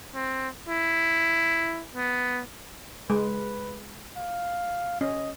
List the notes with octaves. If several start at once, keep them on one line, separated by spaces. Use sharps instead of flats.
C4
E4
B3
G#3 B4
F5
C#4 D#5